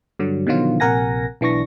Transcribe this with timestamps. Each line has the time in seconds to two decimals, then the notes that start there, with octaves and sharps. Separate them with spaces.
0.19 G2 D3 F#3
0.47 B2 D3 D#3 F3 F#3 F4
0.80 A#1 C3 A#4 F#5 G#5 A#6
1.41 B1 E3 D4 C#6 A#6